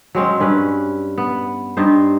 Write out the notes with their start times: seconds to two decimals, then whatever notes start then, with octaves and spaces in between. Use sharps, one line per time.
0.15 F#3 G#3 C4 C#4
0.40 G2 C#4 B4
1.18 B3
1.77 G2 D#4 C5